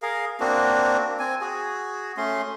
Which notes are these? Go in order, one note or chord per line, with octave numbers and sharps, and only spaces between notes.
G#4 A#4 F5
A#3 C4 D4 F#4
C4 G#5
F#4 G#4
A3 C#4 C6